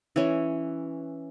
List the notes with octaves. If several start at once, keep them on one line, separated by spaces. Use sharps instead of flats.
E3 C#4